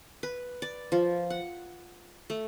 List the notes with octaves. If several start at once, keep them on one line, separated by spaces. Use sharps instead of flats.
B4
D5
F3
F#5
A3